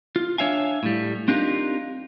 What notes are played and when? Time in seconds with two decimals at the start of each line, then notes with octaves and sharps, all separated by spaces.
0.16 F4
0.38 D4 C#5 E5 F5 G#5
0.83 A2 G3
1.28 C4 D4 D#4 F4 G4 A#4